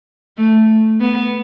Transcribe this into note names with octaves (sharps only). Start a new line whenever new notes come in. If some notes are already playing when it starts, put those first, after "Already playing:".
A3
B3